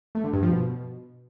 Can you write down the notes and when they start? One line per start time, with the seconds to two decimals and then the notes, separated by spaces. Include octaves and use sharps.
0.15 A3
0.24 D3
0.33 G2
0.43 F3
0.52 B2